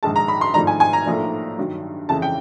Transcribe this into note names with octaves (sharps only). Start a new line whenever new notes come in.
A#1 G#2 D#3 G#3 A5
A#5
B5
C6
G#1 G#2 F3 A3 D4 A#5
G#5
G#5
A#5
B1 A2 F3 A#3 D4
G2 D#3 F#3
F2 C#3 E3 A5
G5